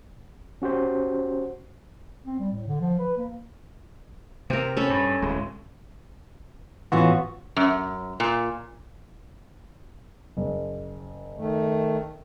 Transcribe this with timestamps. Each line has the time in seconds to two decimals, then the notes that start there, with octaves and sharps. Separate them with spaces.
0.62 C#4 F#4 G4 C5
2.26 C4
2.39 G3
2.52 A2
2.67 D3
2.81 F3
2.99 B4
3.18 A#3
4.50 C3 C4 A#4
4.77 C#4 A4 B5
4.90 G2
5.22 D1 G#3
6.92 A2 E3 B3 C#4 F4 F#4
7.56 F#2
8.20 A#2
10.37 F#1
11.38 D#3 A3